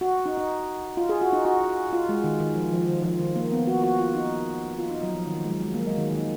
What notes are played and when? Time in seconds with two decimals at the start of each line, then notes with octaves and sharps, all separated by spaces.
0.01 F#4
0.26 D#4
0.37 D#4
0.97 F4
1.09 G#4
1.21 F#4
1.33 D#4
1.45 F#4
1.93 F4
2.09 G#3
2.24 D#3
2.40 D#3
2.56 F3
2.72 F3
2.88 D#3
3.03 F3
3.19 D#3
3.36 A#3
3.52 B3
3.67 F#4
3.83 F#4
3.99 F4
4.15 D#4
4.78 F4
4.91 D#4
5.03 F#3
5.15 F3
5.27 D#3
5.38 D#3
5.45 G#3
5.50 F#3
5.62 G#3
5.74 A#3
5.80 F#3
5.87 G#3
5.98 D#3
6.10 D#3